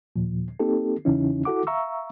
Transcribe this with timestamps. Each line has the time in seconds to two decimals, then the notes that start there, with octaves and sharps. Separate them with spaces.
0.16 D#2 A#2 F3
0.60 A#3 C4 D#4 G4 A4
1.05 E2 C#3 E3 C#4 D#4 E4
1.45 E4 F#4 A4 F#5 D6
1.67 E5 F5 A#5 C#6 E6